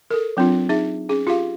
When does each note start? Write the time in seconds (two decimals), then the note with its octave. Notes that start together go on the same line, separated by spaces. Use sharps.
0.11 A4 A#4
0.37 F#3 C4 D4 F4
0.69 D#4 G#4 E5
1.09 C#4 G#4
1.27 F4 G4 G#4 F5